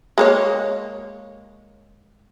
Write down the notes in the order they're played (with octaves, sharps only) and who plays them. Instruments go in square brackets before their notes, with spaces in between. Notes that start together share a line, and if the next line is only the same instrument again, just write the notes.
[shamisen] G#3 A#3 C#5